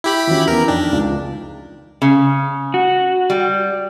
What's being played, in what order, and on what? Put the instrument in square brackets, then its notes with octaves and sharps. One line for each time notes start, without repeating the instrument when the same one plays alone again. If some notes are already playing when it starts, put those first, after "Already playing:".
[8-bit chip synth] E4 G4 B5
[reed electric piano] D#3 F4 F#4 [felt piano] E3 C#4
[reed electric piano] E2 B3 [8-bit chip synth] A#4
[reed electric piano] F2 D#4 [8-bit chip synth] D4 [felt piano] G5
[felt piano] C#2
[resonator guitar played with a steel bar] C#3
[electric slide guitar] F#4
[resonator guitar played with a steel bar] G3